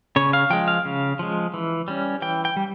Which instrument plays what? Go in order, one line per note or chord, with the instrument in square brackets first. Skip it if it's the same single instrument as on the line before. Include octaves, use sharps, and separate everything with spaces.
[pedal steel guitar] C#3 C#5
F5
F3 G#3 G5
F5
C#3
F3 G#3
E3
G3 C#4
E3 G5
G5
G3